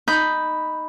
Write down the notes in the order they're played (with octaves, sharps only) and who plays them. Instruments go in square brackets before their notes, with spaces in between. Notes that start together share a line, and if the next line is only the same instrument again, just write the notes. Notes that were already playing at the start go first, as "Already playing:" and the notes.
[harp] D#4 B5 G6